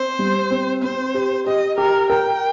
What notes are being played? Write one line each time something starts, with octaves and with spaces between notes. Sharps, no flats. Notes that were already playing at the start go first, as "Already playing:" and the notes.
Already playing: C4 C5
G3
C4
C4 C5
G4
G4 D#5
G4 A#4
A#4 G5